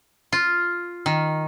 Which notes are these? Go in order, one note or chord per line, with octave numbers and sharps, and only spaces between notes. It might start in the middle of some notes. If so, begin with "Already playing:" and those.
F4
D#3